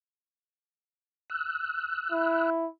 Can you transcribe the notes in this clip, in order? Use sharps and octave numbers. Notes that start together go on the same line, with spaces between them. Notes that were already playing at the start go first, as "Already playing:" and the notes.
E6 F#6
E4